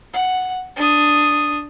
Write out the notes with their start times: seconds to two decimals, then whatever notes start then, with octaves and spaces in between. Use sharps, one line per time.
0.14 F#5
0.77 D4 D#6